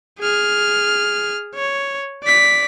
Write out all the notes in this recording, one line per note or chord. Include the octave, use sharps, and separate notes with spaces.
G#4 F6
C#5
D5 B6